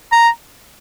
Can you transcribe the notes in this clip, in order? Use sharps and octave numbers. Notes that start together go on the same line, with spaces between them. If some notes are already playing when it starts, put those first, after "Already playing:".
A#5